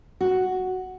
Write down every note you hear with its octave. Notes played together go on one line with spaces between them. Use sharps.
F#4